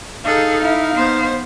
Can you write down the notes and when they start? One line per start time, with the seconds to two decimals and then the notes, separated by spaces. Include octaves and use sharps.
0.25 D#4 G#4 A4 F5
0.62 E4
0.96 B3 C5